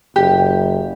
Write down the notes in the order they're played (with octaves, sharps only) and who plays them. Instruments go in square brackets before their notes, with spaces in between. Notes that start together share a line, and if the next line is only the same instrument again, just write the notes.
[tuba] F#1 [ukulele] G4